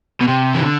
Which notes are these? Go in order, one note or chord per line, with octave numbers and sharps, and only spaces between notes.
B2
C3
E3
D3